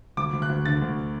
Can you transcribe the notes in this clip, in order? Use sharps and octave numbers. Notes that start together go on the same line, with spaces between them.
D2 D6
D2
F#6
D2
D3 A6
D2